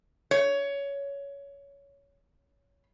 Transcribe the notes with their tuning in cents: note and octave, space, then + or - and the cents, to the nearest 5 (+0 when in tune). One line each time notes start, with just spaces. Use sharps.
C#5 +15